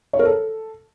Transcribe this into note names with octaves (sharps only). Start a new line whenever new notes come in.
C#5
A#4
A4